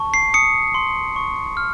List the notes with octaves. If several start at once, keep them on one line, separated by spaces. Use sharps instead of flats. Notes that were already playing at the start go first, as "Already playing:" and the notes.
Already playing: A5 C#6
C7
D#6 C#7
C6
C#6
F6